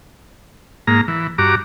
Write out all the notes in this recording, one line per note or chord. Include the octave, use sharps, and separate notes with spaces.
G#2 A#3 A#5
E3
G2 F#4 A#5 D6